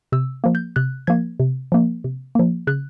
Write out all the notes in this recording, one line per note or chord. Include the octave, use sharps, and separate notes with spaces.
C3 E6
F3 A#3
G6
C3 F#6
F3 A#3 G#6
C3
F3 A#3
C3
F3 A#3
C#3 F#6